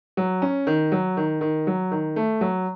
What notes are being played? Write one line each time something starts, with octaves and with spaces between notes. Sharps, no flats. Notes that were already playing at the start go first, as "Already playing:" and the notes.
F#3
C#4
D#3
F#3
D#3
D#3
F#3
D#3
A3
F#3